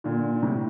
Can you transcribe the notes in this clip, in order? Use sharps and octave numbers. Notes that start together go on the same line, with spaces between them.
A#2 D3
A2 C3